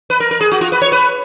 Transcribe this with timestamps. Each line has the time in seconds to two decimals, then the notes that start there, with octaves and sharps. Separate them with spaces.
0.10 B4
0.20 A#4
0.31 A#4
0.41 G#4
0.52 F#4
0.61 F4
0.72 B4
0.82 C#5
0.92 B4